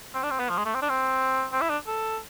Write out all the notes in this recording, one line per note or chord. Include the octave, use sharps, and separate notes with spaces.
C4
D4
C4
B3
F3
G#3
A3
C4
D4
C4
C4
E4
D4
A4